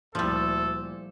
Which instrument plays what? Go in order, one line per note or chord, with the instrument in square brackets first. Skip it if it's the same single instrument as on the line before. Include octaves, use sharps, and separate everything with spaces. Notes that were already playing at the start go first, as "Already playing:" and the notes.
[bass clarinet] D2 [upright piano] A#2 E4 [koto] F3 G3 [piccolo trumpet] A4